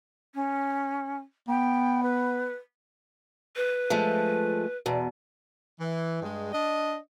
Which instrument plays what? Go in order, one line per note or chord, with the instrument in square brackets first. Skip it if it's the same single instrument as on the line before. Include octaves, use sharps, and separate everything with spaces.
[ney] C#4
[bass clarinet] B3 [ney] G5
[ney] B4
[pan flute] B4
[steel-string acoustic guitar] F3 G#3 A3
E2 B2
[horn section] E3
G2 G#3
D4 D#5